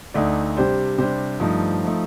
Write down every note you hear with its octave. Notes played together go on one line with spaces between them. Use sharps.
D2 D3 A3 D#4 D5
C3 G3 D4 C5
C3 G3 D4 C5
G2 F3 A3 D#4
F3 A3 D#4